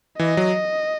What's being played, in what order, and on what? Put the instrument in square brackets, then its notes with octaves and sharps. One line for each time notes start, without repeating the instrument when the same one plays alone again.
[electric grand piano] E3 [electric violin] D#5
[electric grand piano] F#3